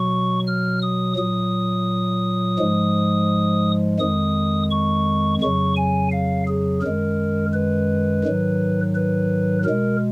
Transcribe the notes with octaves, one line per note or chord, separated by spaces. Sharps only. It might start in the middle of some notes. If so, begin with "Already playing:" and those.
Already playing: B2 F#3 C#6
F6
D#6
A#2 F#3 D#6
G#2 F3 G#3
F2 D#3 G#3 D#6
C#6
F2 C#3 F#3 C#6
G#5
F5
G#4
F#2 D#3 G#3 A#4
B4
G#2 D#3 F#3
B4
B2 G#3 A#4